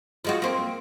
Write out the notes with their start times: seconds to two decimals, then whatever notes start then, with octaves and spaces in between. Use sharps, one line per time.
0.25 F3 G#3 F#4
0.42 A#3 C4